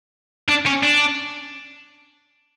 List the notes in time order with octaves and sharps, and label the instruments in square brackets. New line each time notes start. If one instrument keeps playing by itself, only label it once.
[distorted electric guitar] D4
C#4
D4